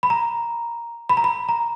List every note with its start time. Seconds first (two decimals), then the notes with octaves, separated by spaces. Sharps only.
0.03 B5
0.10 A#5
1.09 B5
1.17 A#5
1.24 B5
1.49 A#5